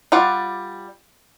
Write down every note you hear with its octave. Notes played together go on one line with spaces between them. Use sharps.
G3 F4 D5 F#5